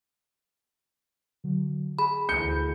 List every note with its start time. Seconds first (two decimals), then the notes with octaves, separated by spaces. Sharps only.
1.44 D3 F#3
1.99 G#4 B5
2.29 D2 E3 G6 C#7